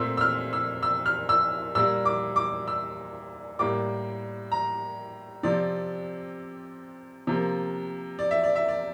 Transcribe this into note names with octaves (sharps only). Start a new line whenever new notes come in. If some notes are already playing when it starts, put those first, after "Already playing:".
Already playing: A#2 A3 C4 E6
E6
F6
E6
E6
F6
E6
A#2 G3 A#3 E6
D6
D6
E6
A2 G3 A#3 D6
A#5
C3 F3 C4 D5
C3 F3 A#3
D5
E5
D5
E5
D5